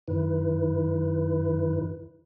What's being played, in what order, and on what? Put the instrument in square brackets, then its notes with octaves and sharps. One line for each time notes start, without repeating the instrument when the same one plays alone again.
[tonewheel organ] F#2 D#3 E4 B4